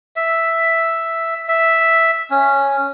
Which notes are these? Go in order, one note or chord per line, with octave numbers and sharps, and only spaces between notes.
E5
E5
C#4